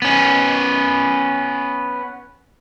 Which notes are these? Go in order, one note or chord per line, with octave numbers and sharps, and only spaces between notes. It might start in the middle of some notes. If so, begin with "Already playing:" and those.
B3 C#4